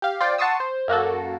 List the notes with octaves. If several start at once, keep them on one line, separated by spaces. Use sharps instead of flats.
G4 F5
F4 C5 D5 G5
F#5 A5 C6 C#6 D#6 E6
C5
F#2 A#3 F#4 A4